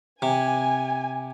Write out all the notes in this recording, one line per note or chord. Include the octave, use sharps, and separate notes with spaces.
C3 G#5